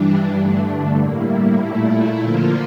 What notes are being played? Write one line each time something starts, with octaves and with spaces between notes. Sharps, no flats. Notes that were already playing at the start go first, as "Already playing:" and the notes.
Already playing: G2 E3 G3 D4
G2 D3 A3 D4
A2 G3 A#3 E4
A#2 A3 E4
D3 F3 A#3 F4